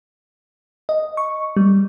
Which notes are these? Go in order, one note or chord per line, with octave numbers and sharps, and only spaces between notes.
D#5
C#6
G3